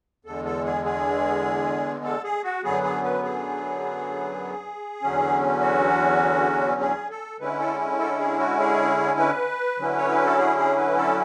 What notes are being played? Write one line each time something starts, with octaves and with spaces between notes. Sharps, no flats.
E2 D3 G#3 A4
A4
G#4
G#4
A4
G#4
F#4
F#2 D3 F#3 B3 G#4
G#4
B4
G#4
E2 D3 F#3 C#4
F#4
G#4
A4
D3 G#3 C#4 E4 B4
A4
A4
G#4
F#4
G#4
B4
D3 F#3 C#4 E4
C#5
B4
A4
G#4
G#4
B4
A4